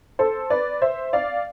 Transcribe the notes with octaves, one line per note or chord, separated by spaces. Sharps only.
A4 C5
B4 D5
C5 E5
D5 F5